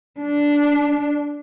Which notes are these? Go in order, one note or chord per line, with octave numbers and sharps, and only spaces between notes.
D4